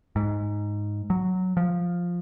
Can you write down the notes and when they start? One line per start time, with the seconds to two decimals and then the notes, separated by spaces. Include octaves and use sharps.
0.16 G#2
1.10 F#3
1.57 F3